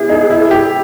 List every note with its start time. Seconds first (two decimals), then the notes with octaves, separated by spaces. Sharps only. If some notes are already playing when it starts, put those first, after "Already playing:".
Already playing: B3 E4 G#4
0.09 D#4
0.30 E4
0.51 G4